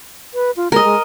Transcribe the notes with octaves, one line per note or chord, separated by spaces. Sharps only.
B4
F4
G#3 A#4 D#5
G#3